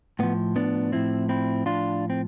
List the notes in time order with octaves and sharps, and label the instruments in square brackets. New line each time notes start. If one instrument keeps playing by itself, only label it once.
[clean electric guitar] A2 F3 B3
B3 D4
A2 F3 C4 E4
C4 E4
A2 F3 D4 F4
C4